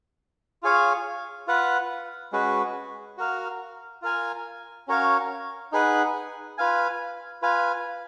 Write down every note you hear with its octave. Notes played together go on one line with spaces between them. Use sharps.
F4 G#4 C#5 F5
F4 B4 F#5
G#3 C#4 F#4 B4
F#4 A#4 F5
F4 A#4 F5 G#5
C#4 F#4 A#4 C#5 F5
D#4 G#4 B4 F#5
F4 B4 F5 G#5
F4 B4 F5 G#5